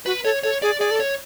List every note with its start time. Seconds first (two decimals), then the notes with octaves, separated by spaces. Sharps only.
0.06 F#4 B4
0.25 A4 C#5
0.43 A4 C#5
0.62 G#4 D5
0.79 G#4 D5
0.91 A4
1.00 C#5